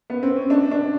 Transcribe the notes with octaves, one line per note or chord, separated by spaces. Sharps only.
B3
C4
C#4
D4
D4